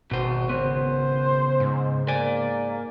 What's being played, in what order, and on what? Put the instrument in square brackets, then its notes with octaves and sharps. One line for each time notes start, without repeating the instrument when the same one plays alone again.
[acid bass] G#1 [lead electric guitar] B2 C5 [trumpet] F#4
[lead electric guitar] C#3 B3 [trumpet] C5
[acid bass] G#2
[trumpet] A#3 [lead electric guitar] D5 G#5